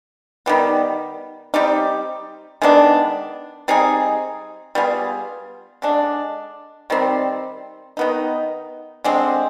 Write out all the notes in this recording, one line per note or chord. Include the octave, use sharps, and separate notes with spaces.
D#3 G3 B3
G3 C4 D#4 G4
D#3 G#3 B3 D4
G3 C4 D#4 G#4
G3 B3 F4 G#4
D3 G#3 D4
D#3 G3 C4
D#3 B3 D#4
D3 G#3 C4